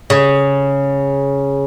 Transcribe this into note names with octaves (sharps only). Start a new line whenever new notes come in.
C#3